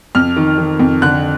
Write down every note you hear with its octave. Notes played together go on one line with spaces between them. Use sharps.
F2 F6
D#3
D#3
F2
D3 F#6